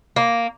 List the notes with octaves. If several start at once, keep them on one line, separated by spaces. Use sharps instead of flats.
A#3